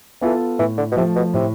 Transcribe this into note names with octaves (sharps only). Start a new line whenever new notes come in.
E3 B3 F4 A4
A2 E3
D3
B2
C3 F3 A3
B2
A2 C3